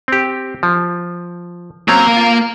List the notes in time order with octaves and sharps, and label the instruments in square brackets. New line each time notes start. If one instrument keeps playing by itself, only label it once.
[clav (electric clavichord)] C4 G4
F3
[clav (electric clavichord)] F#3 C4 C#4 [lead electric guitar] A#3 A#5
[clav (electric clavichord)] F4